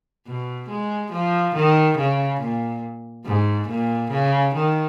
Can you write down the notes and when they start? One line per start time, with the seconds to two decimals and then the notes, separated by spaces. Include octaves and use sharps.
0.27 B2
0.69 G#3
1.12 F3
1.55 D#3
1.98 C#3
2.40 A#2
3.26 G#2
3.68 A#2
4.11 C#3
4.55 D#3